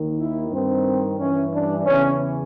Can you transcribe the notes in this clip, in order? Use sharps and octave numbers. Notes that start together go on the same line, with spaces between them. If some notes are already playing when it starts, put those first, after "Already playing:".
Already playing: D#2 D#3
E4
G2 D#3 C4
G2 E3 C#4
D4
E2 C#3 E3 C#4